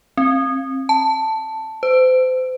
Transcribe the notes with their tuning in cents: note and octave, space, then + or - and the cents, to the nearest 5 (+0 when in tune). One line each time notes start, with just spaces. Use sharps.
C4 +35
A5 +5
C5 -35